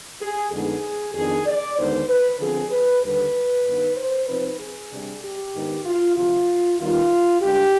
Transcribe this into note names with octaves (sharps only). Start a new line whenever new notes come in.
G#4
F2 D3 G#3 B3 D#4 G#4
F2 D#3 B3 D4 G#4
D5
D#2 D3 G#3 B3 D#4 C5
B4
D3 F3 C4 G#4
B4
D#2 D3 G3 B4
G2 D#3 B3 D#4
C5
C3 F3 C4 D#4 B4
G#4
C3 G3 D4
G4
G#2 D#3 B3 D4
F4
D2 C3 F3 F4
D#2 D#3 G3 B3 F4
G2 D3 G#3 D4 G4